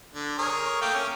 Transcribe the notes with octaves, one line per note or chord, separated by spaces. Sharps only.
D3
G#4 A#4 C#5
A3 A#3 G5
C#4